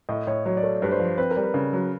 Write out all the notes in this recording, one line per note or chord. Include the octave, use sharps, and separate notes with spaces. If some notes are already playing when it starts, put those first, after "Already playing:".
A2 D#5
A2 C#5
F#3 C#5
D5
A3 C#5
G2 B4
C5
F3
C4 B4
A#4
G3
B4
C#3
F#3